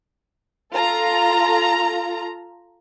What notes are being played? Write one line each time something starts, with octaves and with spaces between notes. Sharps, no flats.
F4 A4 A#5